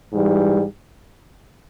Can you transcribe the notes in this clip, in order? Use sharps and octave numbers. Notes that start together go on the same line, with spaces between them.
G#2 E3 G3